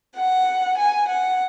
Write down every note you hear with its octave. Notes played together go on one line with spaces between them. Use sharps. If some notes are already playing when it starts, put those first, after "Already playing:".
F#5
G#5
F#5